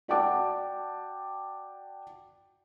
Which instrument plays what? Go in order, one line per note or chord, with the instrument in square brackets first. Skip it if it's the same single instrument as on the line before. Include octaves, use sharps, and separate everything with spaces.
[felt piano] F#4 D5 F#5 G5 A5 D6